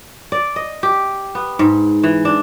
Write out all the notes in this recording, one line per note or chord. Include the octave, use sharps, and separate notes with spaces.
D5
D#5
G4
B3
G#2
E3
D4